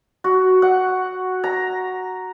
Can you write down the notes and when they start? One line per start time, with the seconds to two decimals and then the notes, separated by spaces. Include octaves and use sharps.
0.24 F#4
0.62 F#5
1.44 A#5